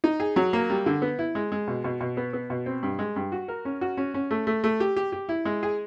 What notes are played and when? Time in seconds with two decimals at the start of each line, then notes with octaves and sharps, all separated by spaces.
0.04 D#4
0.20 G#4
0.36 F#3
0.53 A#3
0.70 G3
0.86 D3
1.02 B3
1.19 E4
1.35 G#3
1.52 G#3
1.68 B2
1.84 B2
2.01 B2
2.17 B3
2.33 B3
2.50 B2
2.66 C4
2.83 G2
2.99 G#3
3.16 G2
3.32 F#4
3.48 A#4
3.65 C#4
3.81 F#4
3.97 C#4
4.14 C#4
4.31 A3
4.47 A3
4.64 A3
4.80 G4
4.96 G4
5.12 G4
5.29 E4
5.45 G#3
5.63 G#4